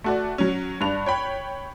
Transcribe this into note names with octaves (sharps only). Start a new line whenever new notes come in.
A3 F#4 D5
F#3 C#4
G2 D4 F#6 F7
C#5 G5 B5